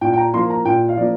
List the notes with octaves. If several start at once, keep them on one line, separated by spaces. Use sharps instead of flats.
A#2 G5
G5
A#5
F3 A#3 C6
A#5
A#2 G5
F5
F3 A#3 D5